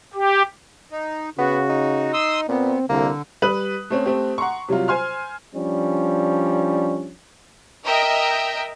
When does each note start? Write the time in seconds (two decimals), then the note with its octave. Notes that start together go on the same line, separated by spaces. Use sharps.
0.14 G4
0.91 D#4
1.38 C#3 B3 F#4
1.69 D#4
2.13 C6 D#6 E6
2.49 A#2 B3 C4
2.89 C2 D3 A#3
3.42 G3 B4 D#6 F#6 F#7
3.90 A3 C4 C#4
4.06 A3 C4 G4
4.38 F#5 A#5 C6 C#6
4.68 C3 F#3 G3 F4
4.88 C5 G#5 C6 F6
5.54 F3 G3 C#4 D4
7.85 A#4 D#5 E5 G5